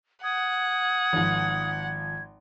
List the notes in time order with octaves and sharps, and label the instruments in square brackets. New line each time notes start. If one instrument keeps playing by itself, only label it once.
[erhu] F#5 [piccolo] D#6 [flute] G#6
[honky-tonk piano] G#1 F3